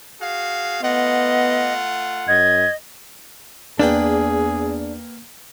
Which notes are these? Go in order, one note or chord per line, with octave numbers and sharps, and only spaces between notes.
F#4 G#4 F5
A3 B3 F4 D#5 F#5
F#2 D#5 G#6
E2 A#3 D4 G#4 B4 G5